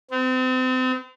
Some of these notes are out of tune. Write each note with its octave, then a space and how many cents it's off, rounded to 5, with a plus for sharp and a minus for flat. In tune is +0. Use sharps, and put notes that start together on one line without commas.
C4 -35